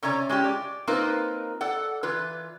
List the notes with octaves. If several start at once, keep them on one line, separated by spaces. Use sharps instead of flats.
C3 C#4 C#5 D5 A#5
G#3 C#4 F4 G4
D5
A#3 C4 D#4 F4 A#4 B4
A4 D5 F#5
E3 F4 B4